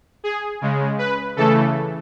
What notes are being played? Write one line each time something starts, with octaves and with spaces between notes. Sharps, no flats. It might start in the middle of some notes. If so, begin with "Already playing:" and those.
G#4
C#3 G#3
B4
C#3 E3 A3 A4